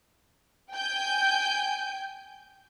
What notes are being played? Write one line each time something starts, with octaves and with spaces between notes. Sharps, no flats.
G5 G#5 G6